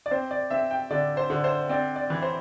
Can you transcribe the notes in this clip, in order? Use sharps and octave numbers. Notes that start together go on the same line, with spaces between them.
D5
C4 C5
D5
C4 E5
G5
D3 D5
C5
D3
C5
C4 D5
D5
E3
C5